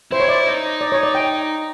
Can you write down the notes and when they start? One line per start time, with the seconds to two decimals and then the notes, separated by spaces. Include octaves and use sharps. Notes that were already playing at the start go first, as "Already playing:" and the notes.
0.11 E4 C5
0.20 C#5
0.29 D5
0.46 D#4
0.81 D5
0.92 C#5
1.03 D5
1.15 G5